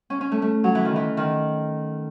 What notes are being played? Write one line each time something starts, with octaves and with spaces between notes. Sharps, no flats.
C#4
C#4
A3
A3
F#3
E3
D#3
E3
D#3